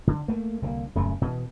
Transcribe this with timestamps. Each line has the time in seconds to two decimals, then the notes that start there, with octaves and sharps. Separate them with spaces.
0.07 D3
0.28 A3 A#3
0.62 C2 D3 E3 A#3
0.95 D#1 F#2 C#3 A3
1.21 B2 E3